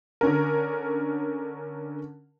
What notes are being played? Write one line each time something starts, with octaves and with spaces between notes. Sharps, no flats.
D3 C#4 A#4